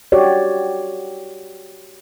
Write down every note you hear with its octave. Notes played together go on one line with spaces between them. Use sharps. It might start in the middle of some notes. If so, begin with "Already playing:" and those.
F#4 G4 C#5 D5